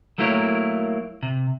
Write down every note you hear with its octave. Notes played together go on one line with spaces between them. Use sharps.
F#3 A3 A#3 E4 A#4 C#5
C3